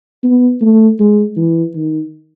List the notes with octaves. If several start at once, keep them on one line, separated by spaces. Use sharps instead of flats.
B3
A3
G#3
E3
D#3